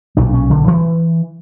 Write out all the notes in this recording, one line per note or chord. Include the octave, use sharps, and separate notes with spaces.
B1 A#2 D4
C#4
D3
E3